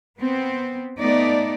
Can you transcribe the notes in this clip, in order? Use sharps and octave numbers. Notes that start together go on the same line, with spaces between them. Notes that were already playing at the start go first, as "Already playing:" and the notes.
B3 C4
A3 B3 D#4 D5